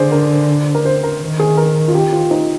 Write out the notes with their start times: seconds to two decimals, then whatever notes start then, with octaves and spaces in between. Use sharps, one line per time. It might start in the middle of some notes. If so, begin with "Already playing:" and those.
Already playing: D3 G#4 C5
0.12 A#4
0.75 A#4
0.85 C5
1.03 A#4
1.21 D#3
1.39 G#4
1.57 A#4
1.88 F4
1.94 G4
2.12 F4
2.31 D#4